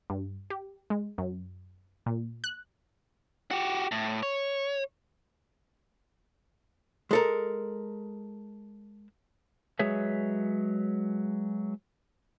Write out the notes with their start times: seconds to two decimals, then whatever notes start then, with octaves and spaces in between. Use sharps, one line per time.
0.10 G2
0.50 G4
0.90 G#3
1.18 F#2
2.06 A#2
2.44 F#6
3.51 F#4 G4
3.92 A2
4.23 C#5
7.11 G#3 A4 A#4
9.79 F#3 G#3 G#4 B4 C#5 E5